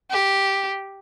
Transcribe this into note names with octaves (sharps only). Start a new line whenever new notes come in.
G4